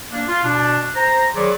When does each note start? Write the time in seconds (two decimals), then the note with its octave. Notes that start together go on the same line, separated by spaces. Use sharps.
0.12 A#3 D4
0.28 F4
0.44 B2 D4
0.95 C5 A#5
1.35 D#3 F#3 G#4 B4 C5 D5